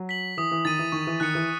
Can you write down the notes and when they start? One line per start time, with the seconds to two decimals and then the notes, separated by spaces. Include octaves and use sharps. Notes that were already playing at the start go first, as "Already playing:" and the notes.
Already playing: F#3
0.09 B6 F#7
0.37 E3 D#6
0.51 E3
0.65 D#3 A6 D#7
0.79 E3
0.92 D#3 C#6
1.07 E3
1.20 D#3 F#6 C#7
1.35 E3